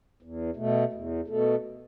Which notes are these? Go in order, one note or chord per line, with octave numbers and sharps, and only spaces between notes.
E2
B2 A3
E2
B2 A3